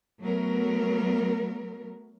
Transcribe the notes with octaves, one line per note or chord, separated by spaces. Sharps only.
F#3 A3 B3 A#4